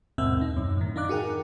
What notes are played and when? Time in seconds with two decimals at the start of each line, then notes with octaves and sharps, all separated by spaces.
0.18 D#2 G#2 B2 C4 E5 E6
0.41 D#4
0.56 F#2
0.77 A2 D#3
0.96 D4 D#4 F5 D6 F#6
1.09 F#4 G#4 A#4 G5